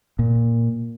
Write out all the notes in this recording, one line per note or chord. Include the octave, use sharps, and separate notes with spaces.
A#2